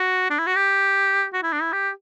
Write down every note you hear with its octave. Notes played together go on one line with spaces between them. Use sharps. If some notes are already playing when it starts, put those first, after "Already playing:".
Already playing: F#4
D4
E4
F#4
G4
F#4
E4
D4
E4
G4